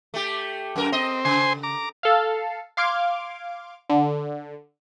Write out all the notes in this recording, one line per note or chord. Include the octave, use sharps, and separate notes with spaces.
A3 G4
F#2 A#4
C4 D#5
C#3 C5 G#5 C6
A#5 D6
A4 F5
F5 C6 D6 F6 G#6 D7
D3